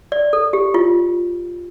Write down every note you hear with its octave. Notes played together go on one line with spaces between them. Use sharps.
D5
A4
G4
F4